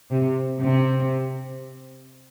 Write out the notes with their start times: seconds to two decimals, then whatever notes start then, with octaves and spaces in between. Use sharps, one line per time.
0.11 C3
0.61 C3